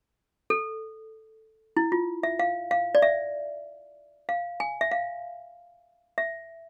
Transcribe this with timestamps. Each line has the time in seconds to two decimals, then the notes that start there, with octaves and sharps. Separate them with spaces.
0.50 A4
1.77 E4
1.92 F4
2.23 E5
2.39 F5
2.71 F5
2.95 D5
3.02 E5
4.29 F5
4.60 G#5
4.81 E5
4.91 F5
6.18 E5